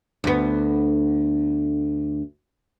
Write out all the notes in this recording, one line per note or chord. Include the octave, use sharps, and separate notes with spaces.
D2 B3